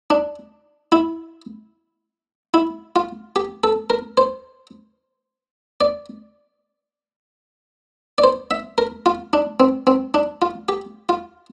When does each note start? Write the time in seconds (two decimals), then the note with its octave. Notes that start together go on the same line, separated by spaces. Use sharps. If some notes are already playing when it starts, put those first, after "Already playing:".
0.10 D4
0.92 E4
2.54 E4
2.96 F4
3.36 G4
3.64 A4
3.90 A#4
4.17 C5
5.81 D5
8.18 D5
8.24 C5
8.51 E5
8.78 A#4
9.06 F4
9.33 D4
9.60 C4
9.87 C4
10.14 D4
10.42 F4
10.69 G4
11.09 F4